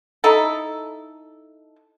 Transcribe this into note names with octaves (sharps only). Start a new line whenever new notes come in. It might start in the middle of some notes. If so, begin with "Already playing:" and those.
D#4 E4 A4